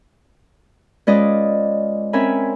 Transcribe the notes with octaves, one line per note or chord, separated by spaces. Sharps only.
G#3 C#4 F4 B4 D5 D#5
C4 C#4 A#4 E5 G#5 B5